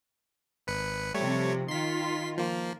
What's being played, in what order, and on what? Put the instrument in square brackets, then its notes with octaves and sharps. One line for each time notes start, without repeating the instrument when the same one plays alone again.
[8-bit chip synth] G#1 B4 C#7
[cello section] C3 F3 [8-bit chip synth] G3 A3 C#5
[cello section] D#3 F4 [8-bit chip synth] C6 B6
[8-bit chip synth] F3 A#3